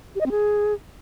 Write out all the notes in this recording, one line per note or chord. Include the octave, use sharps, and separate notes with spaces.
G4
D#5
C4
G#4